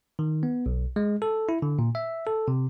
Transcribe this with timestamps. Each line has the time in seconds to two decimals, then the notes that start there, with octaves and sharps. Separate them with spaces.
0.19 D#3
0.43 B3
0.66 B1
0.96 G#3
1.22 A4
1.49 E4
1.62 D3
1.79 A#2
1.95 E5
2.27 A4
2.48 C3